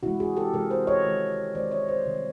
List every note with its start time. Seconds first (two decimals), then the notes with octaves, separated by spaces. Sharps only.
0.03 C3 E4 F#4
0.06 E3 G#3
0.20 F#4 G#4
0.37 G4 A4
0.54 C3 E3 G#3 G#4 A#4
0.71 A#4 C5
0.87 C#5 D#5
1.05 D#3 G#3
1.55 D#3 G#3 C5 D5
1.71 C#5 D#5
1.89 C5 D5
2.06 C3 D#3 G3